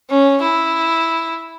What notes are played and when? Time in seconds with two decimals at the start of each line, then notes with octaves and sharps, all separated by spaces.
0.10 C#4
0.42 E4